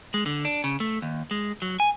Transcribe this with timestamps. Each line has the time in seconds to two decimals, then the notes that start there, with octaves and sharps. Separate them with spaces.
0.14 G#3
0.26 D3
0.45 D4
0.64 C#3
0.80 A3
1.02 D#2
1.31 G#3
1.62 F#3
1.80 G#5